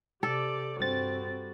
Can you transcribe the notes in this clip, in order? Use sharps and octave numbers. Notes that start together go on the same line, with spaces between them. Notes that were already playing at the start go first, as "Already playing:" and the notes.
C3 G4 A4 D5
G2 G3 C4 F#4 A6